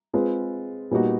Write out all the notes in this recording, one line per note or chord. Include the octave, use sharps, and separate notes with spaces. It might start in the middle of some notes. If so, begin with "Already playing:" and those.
G#3 C4 F4 G#4 B4
A#2 G3 B3 D#4 F#4